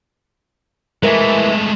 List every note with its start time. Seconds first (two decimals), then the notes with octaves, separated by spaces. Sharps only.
1.03 G#3 A3 A#4 B4 E5